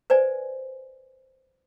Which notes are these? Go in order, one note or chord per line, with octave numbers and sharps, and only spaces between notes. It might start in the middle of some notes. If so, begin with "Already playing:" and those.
B4 C5 D5 G#5